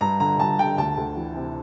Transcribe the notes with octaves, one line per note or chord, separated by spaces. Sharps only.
G2 A#5
D3 A#5
G2 A5
D3 G5
D2 A5
D2
E3
C3